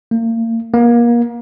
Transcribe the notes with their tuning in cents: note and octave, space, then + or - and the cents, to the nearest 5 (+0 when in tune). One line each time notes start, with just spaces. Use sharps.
A#3 -35
A#3 +30